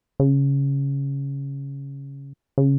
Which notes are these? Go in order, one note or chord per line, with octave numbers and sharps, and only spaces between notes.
C#3
C#3